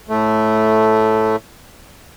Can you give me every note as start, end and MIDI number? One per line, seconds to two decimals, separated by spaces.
0.09 1.36 45
0.09 1.36 57